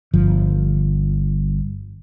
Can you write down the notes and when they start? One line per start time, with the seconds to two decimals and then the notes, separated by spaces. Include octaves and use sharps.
0.14 G1 F3